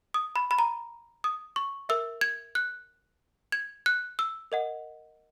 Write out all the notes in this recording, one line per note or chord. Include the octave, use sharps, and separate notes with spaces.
D#6
B5
B5
A#5
D#6
C#6
A#4 E5 E6
G#6
F#6
G#6
F#6
E6
A#4 D#5 F#5